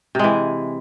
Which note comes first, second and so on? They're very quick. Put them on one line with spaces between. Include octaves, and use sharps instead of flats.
C3 G#3 E3